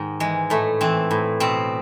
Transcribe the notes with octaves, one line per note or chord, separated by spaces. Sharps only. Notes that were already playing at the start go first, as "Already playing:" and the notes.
Already playing: G#2 D#3
E3 G#3
A2 A3
E3 C4
A2
B2 C4